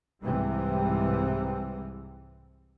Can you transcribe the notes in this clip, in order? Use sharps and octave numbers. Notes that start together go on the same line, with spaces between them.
C2 G#2 C3 E3 G3 G#3